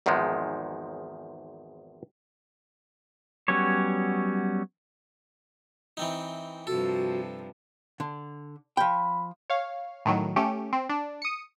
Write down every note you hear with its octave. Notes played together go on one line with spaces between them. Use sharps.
G#1 E2 G#2 D#3 F3 G#3
F#3 G3 B3 C#4 C#5
E3 C4 D#4
G2 C3 F3 F#4 A4
D3
F3 G5 B5
C#5 F5
A2 D#3 F#3
A3 C#4 G4
C4
D4
D#6 C#7